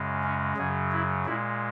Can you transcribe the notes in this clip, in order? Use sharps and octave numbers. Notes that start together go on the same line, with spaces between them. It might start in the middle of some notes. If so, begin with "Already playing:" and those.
Already playing: F#2 C#3 G#3
C#4
F#2 C#3 F#3 G#4
E4
A#2 G#3 E4